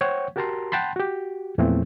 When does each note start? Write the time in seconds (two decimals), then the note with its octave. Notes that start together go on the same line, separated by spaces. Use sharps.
0.01 C5 C#5 F#5 G5 C#6
0.36 F#4 G4 A#4 A5 A#5 C6
0.72 F#5 G5 A5 B5 C6
0.96 F#4 G4
1.58 E2 A#2 E3 F3 A3 C4